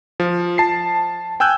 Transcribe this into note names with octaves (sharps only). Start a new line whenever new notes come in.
F3
A5 C7
G5 G#5 E6 F#6 G6